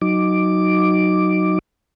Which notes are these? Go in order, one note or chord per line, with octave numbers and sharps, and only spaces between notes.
F#3 D#4 D6